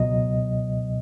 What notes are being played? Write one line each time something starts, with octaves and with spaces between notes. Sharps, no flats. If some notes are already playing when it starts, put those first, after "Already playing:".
Already playing: C#2 B2 F#3 D#5